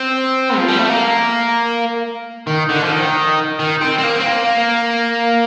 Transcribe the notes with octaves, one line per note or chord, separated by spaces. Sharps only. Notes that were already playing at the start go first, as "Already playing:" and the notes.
Already playing: C4
F3
G3
A3
A#3
D#3
D3
F3
D#3
D#3
C4
C4
A#3
C4
A#3